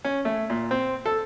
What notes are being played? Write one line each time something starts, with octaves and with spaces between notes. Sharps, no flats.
C#4
A3
A#2
C4
A4